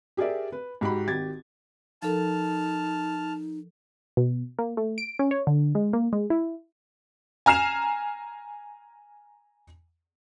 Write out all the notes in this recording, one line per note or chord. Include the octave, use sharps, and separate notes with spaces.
G4 G#4 A#4 D5 E5
B4
G#2 F#4 G4 B5
G#1 G4 G#6 A6
F3 D#4 A4 A#4 A5 F6
B2
A#3
A3
D7
C#4
C#5
D3
G#3
A#3
G#3
E4
G#5 A#5 F6 C7 E7 F7